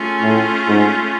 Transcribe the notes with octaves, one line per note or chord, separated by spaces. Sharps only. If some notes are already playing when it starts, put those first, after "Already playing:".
Already playing: A3 C#4 F4 G#4
A2
G#2